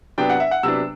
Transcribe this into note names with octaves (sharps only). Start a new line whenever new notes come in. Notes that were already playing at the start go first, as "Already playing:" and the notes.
C3 F#3 B3 D4 G5
F#5
E5
F#5
C3 F#3 B3 D4 E6